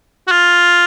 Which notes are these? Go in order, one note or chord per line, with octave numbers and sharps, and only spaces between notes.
F#4
F4